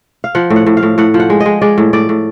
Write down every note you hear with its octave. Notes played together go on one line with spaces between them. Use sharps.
F5
F3 F#5
A2
F#5
A2
F5
A2
A2 F#5
F3
F#5
G#3
D#5
G#3
G#3 D5
A2
A2 D5
A2